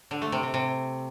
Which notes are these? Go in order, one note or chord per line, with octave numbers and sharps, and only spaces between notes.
D3
A3
C3
C3
C3